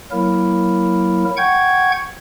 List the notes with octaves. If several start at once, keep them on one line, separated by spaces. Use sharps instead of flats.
F#3 A#3 E4 A#4
F#5 G5 C#6 G6 G#6